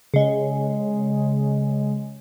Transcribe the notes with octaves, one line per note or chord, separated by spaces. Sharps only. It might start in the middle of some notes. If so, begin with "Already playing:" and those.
C#3 G#3